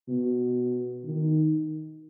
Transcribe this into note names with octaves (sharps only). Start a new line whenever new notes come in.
B2
D#3